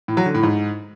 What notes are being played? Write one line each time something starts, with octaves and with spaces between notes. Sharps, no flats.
A2
F#3
D3
A2
G#2